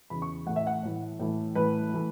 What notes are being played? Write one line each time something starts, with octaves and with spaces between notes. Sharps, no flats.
E2 C#3 E3 B5
C#6
A2 E3 A3 F#5
E5
F#5
A2 E3 A3
A2 E3 A3
A2 E3 A3 B4
E3 A3